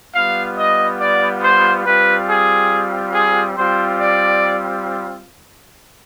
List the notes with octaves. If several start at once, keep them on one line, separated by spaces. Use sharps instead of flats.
G3 B3 F4 F5
D#5
D5
C5
G3 C4 F4 B4
G#4
G#4
G3 C4 F4 C5
D5